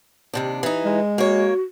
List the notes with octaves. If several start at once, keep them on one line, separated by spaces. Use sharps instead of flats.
D#2 C3 D4
E3 D#4
G#3
A#3 F#4 C#5